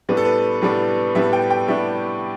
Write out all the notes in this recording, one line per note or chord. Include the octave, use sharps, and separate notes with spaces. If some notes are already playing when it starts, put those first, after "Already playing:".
A2 G3 B3 D4 B4
A4
B4
A2 G3 B3 D4
A2 G3 B3 D4 E5
G5
G5
A2 G3 B3 D4 E5